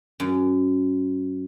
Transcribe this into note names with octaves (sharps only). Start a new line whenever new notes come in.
F#2